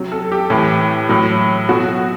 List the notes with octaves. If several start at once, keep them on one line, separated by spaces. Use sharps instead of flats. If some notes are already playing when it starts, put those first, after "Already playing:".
Already playing: C3 F#3
A4
G4
A2 E3
A2 F#3
B2 F#3 F#4